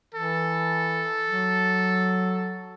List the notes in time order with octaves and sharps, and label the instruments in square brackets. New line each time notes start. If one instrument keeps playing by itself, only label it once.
[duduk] E3 [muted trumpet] A4
[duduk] F#3